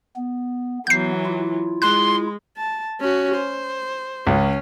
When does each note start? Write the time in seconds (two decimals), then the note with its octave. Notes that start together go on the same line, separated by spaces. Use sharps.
0.16 B3
0.87 E3 F#3 B3 G6 C7
1.25 E4 F4
1.82 G#3 C6 F#6
2.57 A5
3.01 C#4 F#4
3.34 C5
4.27 C#2 C#4